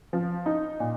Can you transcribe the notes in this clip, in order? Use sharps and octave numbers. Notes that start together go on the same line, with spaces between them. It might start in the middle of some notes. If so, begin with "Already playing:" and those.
F3
D#4
A#2